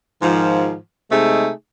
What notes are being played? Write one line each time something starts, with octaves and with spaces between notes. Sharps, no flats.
G#2 D#3 F3
C3 G#3 A3 D#4 G#4